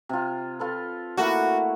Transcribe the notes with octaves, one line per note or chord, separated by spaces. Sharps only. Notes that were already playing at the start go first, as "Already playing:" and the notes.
C3 F4
F4 A4 B4
A3 A#3 E4 F#4